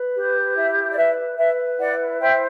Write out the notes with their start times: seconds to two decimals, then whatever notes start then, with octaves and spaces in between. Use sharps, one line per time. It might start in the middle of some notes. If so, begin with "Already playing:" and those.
Already playing: B4
0.15 G4
0.55 E4 E5
0.92 D5
0.96 B4 E5
1.37 B4 E5
1.79 E4 D5 F#5
2.20 C5 E5 G5